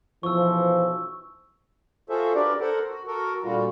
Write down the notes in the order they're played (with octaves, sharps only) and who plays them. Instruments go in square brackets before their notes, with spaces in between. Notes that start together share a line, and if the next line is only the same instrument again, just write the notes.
[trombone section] B1 E3 F3 [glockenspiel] C#6 E6
[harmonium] F4 F#4 G#4 A4 C5 E5
D4 G4 A#4 B4 D5
A4 A#4 C5 F#5
F#4
F#4 A4 A#4
A#2 D3 G3 F4 F#4